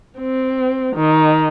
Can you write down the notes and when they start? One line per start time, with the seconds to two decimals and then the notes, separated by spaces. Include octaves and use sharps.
0.18 C4
0.95 D#3